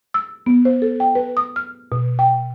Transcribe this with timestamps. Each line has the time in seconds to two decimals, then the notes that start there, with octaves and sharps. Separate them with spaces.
0.14 E6
0.46 B3
0.65 C5
0.82 A4
1.00 G5
1.15 B4
1.37 D#6
1.56 F6
1.92 B2
2.19 G5